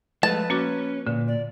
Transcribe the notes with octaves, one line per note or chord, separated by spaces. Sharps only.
F3 G#3 A3 B4 A5
A#3 C#4 F#4 D6
A#2 D3
D5